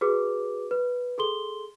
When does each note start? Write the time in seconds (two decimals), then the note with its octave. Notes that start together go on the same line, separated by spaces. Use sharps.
0.01 F#4 G#4 B4 D6
0.71 B4
1.18 G#4 A4 C6 G7